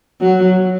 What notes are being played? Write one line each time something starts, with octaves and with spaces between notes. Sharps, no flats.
F#3